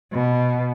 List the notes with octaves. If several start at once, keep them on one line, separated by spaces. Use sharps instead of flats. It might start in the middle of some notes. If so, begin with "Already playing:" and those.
B2